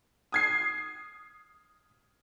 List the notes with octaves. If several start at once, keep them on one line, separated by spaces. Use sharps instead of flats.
D#6 G#6 C7